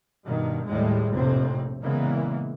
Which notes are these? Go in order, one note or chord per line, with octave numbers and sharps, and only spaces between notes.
G2 B2 D#3
D#2 A2 G3 G#3
F1 A#1 F2 A2 C3 C4
A#2 C#3 E3 G#3 A#3 B3